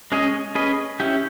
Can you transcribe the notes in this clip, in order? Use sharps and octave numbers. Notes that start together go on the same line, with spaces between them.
G#3 C#4 G#4 D#5
C#4 G#4 B4 D#5
C#4 E4 G4